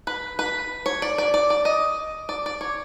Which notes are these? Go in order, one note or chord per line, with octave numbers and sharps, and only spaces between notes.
B4
B4
C#5
D5
D5
D5
D5
D#5
D5
D5
C#5